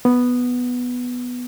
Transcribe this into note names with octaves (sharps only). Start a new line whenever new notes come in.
B3